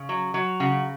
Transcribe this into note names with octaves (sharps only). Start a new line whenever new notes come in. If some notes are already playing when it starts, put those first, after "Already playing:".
Already playing: C#3
F#3
F#3
C#3 F#4